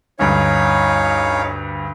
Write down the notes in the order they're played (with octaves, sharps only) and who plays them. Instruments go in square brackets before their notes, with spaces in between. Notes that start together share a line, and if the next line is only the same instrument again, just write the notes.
[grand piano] D2 G2 [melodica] C#4 D#4 F5 [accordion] C#5